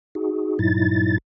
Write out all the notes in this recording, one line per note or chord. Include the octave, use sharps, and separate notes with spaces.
D#4 F#4 G#4
G2 A#2 F#3 D#4 E4 A6